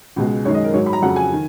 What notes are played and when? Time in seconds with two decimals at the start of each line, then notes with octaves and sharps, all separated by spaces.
0.16 C#2 B2 G#3
0.45 F#2 D#3 G#3 C#5
0.54 D#5
0.64 A#4
0.73 G#2 F#3 C#5
0.86 B5
0.93 A#5
1.02 F2 C#3 F#3 F#5
1.16 G#5
1.32 D#3